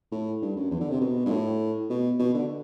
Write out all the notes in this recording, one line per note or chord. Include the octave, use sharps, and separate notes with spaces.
A2
G2
F#2
E2
D3
C3
B2
G2
A2
B2
B2
D3